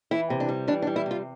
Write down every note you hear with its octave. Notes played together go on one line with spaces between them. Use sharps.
E3 E4
C3
D4
G3
E3 D4
D4
G3
E4
C3 F4